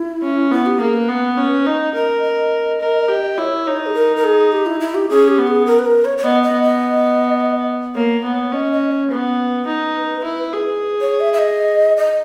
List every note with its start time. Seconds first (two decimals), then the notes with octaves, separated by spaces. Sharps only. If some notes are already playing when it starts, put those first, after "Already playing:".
Already playing: E4
0.22 C#4
0.51 B3 E4
0.66 G4
0.80 A#3 G#4
0.94 B4
1.08 B3
1.37 C#4
1.66 D#4 D#5
1.94 A#4 D#5
2.23 D#5
2.81 A#4
3.08 G4
3.38 E4 C#5
3.67 D#4
3.86 G#4
3.94 A#4
4.16 A#4
4.24 G#4
4.52 G4
4.66 E4
4.80 E4
4.95 G4
5.09 C#4 G#4
5.28 G4
5.38 B3
5.47 G#4
5.66 A#4
5.79 B4
5.85 A#4
6.05 C#5
6.18 C#5
6.24 B3 D#5
6.43 D#5
6.52 B3
6.63 D#5
7.95 A#3 C#5
8.24 B3
8.52 C#4 D#5
8.72 D#5
8.91 C#5
9.11 B3 B4
9.67 D#4
10.24 E4
10.53 G#4
11.01 C#5
11.20 E5
11.33 E5
11.39 D#5
11.97 D#5